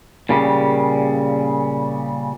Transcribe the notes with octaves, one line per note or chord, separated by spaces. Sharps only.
A#2 C#3 G3